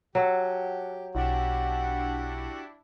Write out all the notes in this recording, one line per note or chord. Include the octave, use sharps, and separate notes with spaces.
F#3 G4 A4 F#5
B1 D4 E4 F#4 G4 F#5